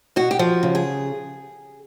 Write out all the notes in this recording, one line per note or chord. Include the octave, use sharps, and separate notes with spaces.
B2 F#4
G4
F3 F#4
C#3
G#4